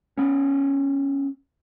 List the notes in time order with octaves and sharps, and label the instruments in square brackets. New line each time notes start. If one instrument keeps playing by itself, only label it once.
[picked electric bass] B3 C#4